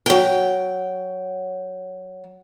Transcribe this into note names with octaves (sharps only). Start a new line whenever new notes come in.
F#3 G5